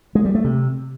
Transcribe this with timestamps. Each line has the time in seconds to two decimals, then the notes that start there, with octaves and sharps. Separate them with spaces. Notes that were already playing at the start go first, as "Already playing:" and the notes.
0.15 G#3
0.25 G3
0.35 A3
0.44 C3